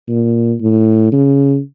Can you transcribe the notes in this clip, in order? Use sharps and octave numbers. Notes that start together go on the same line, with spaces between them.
A#2
A2
C#3